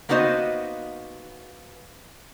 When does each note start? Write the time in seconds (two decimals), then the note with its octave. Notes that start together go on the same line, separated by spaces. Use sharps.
0.09 A#3 B3 D#4 F#4 C5 D#5